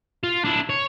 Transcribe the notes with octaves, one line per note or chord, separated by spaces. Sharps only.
F4
D4 E4
C#5